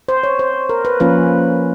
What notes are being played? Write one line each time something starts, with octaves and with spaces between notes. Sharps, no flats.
C5
C#5
C5
A#4
B4
F3 A#3 C#4 F4 B4